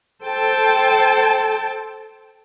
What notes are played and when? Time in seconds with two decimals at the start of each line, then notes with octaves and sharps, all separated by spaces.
0.24 A4 C5 G5 A5